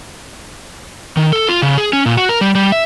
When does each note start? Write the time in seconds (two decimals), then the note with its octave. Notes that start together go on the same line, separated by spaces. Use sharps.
1.17 D#3
1.33 A4
1.49 F4
1.62 C#3
1.78 G#4
1.93 C#4
2.06 A#2
2.17 F#4
2.29 A#4
2.41 G3
2.55 G3
2.72 E5